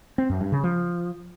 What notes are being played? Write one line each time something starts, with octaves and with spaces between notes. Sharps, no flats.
C4
F#2
G2
C#3
F3